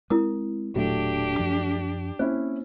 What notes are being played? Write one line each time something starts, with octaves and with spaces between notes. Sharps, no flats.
G#3 C4 E4 A#4 D#6
E1 A#2 F#3 A3 D4 G4
F#2 F3
A#3 C4 C#4 E4 C5